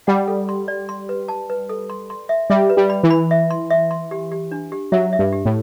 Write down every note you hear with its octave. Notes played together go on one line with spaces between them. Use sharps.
G3 F#5
A4
C6
D5
C6
B4
A5
B4
A4
C6
C6
E5
G3 E5
B4
G3
B5
E3
B5
E5
C6
E5
C6
G4
G4
D4
G4
F#3 E5
E5
G2
G4
A2